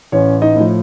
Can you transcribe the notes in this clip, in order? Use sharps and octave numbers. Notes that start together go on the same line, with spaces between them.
A1 C#4 C#5
D#4 D#5
A2 F3